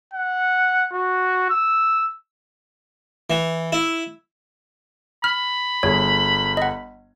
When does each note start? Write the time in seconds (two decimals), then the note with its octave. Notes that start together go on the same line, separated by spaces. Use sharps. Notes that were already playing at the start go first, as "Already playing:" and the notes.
0.14 F#5
0.92 F#4
1.50 E6
3.30 E3
3.72 E4
5.24 B5 F6
5.83 G1 G#4 C#5
6.57 D#5 F#5